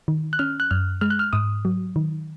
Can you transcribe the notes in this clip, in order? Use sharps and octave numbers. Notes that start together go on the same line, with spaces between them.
D#3
F#6
C#4 F6
F#6
F#2 F6
G#3 F6
F#6
F6
G#2 D#6
F#3
D#3